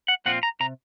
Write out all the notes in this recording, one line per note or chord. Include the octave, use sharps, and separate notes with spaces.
F#5
A#2 F3 C4 F4 F#5
A#5
C3 A#5